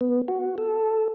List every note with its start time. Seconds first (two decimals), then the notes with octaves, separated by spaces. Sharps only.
0.01 B3
0.28 F#4
0.58 A4